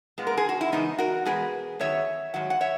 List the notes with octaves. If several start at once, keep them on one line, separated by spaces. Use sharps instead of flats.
A#2 G#3 B3
A#4
G#4
F#4
E4
E2 C#3 G#3 B3 D#4
F#4 A#4
E2 B2 G#3 B3 G#4 B4
F#2 D#3 F#3 B3 C#5 E5
G#2 D#3 F#3 F#5
F#5
C#5 E5